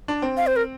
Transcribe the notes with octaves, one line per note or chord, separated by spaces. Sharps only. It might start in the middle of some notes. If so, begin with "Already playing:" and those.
D4
C4
F5
C5
A#4